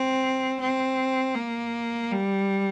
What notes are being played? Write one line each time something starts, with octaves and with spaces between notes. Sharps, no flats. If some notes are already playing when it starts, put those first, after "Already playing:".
Already playing: C4
C4
A#3
G3